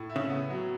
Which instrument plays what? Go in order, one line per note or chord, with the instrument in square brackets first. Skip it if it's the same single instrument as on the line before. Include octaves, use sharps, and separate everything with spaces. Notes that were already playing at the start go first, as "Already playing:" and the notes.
Already playing: [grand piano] A2
E4
[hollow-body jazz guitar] C#3
[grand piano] B3
F#3